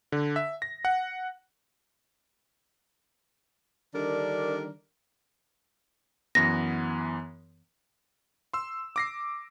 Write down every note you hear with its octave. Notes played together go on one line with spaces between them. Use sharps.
D3
E5
A#6
F#5
D3 D#3 G3 D4 A#4
F#2 E3 B3 A#6
C6 E6
D6 A#6 C7